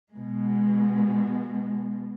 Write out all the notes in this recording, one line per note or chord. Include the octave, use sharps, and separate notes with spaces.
B2 G#3